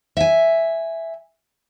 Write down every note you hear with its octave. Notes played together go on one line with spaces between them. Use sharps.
E5 G#5